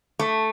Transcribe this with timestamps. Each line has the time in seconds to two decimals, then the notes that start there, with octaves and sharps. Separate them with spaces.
0.19 A3